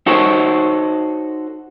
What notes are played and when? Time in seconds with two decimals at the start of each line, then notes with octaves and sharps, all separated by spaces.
0.06 D#4 F#4 A4 C5 C#5